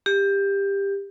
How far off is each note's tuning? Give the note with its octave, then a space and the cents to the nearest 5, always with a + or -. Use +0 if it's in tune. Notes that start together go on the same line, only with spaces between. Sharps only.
G4 +15